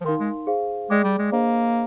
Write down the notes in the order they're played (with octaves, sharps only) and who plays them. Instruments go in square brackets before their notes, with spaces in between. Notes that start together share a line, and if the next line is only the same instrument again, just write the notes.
[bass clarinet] F3
[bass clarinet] D#3 [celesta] D#4 A#4 F5 C6
[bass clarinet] G#3
[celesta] G#4 C5 F5
[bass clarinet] G#3 [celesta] G#4 D5 G5 D6
[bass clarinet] G3
G#3
[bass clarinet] A#3 [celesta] D4 G#4 C5 D#5